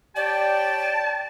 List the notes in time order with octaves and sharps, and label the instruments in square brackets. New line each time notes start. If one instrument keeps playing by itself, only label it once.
[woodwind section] G4 C#5 G5 [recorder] D5 [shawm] A5